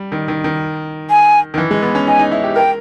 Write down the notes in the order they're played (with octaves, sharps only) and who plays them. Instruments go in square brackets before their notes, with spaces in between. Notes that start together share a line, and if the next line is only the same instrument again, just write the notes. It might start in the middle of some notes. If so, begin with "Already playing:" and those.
Already playing: [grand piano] G3
D#3
D#3
D#3
[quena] G#5
[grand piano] D#3
E3
G#3
B3
C#4
[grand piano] D#4 [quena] G#5
[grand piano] D#4
E4
G4
[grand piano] A#4 [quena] G5